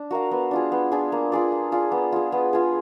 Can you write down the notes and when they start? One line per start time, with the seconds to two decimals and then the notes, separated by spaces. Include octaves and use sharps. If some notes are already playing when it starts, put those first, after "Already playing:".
Already playing: D4
0.11 F#4 A#4 F5
0.31 B3
0.51 D4 F4 G#4
0.72 B3
0.92 D4 F4 G#4
1.12 A#3
1.32 F4 G#4 D5
1.52 A#3
1.72 F4 G#4 D5
1.92 B3
2.12 F4 G#4
2.32 B3
2.53 F4 G#4